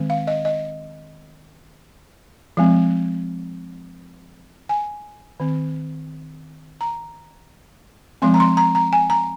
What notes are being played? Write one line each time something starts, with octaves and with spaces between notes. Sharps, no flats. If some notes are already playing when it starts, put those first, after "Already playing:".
Already playing: D#3 G#3 C4
F5
D#5
D#5
F3 G#3 C4
G#5
D#3 C4
A#5
F3 G#3 C4 C6
A#5
C6
A#5
A#5
G#5
A#5